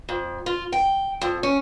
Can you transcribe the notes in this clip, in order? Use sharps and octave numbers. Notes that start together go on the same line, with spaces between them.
F2
F4
G5
F2
C#4